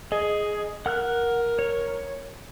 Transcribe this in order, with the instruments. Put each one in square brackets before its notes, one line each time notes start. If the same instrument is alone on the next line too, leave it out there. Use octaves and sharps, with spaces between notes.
[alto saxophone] G#4 [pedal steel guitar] D#5
[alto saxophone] A#4 [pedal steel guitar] F#5 F6 F#6
[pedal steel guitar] C#5